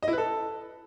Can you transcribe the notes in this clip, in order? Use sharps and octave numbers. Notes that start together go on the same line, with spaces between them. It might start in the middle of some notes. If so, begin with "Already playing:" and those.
D#5
E4
B4
A4